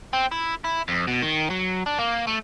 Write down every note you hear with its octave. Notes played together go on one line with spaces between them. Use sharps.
C4
E4
E4
F2
B2
D#3
F#3
D4
A#3
A3